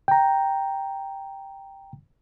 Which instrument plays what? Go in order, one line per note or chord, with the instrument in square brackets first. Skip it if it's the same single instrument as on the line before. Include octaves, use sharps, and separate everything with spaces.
[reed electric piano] G5 A#5